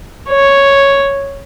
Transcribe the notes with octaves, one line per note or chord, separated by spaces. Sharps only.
C#5